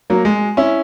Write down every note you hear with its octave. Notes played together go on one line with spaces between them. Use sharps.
F#3 A#3
G#3
C#4 E4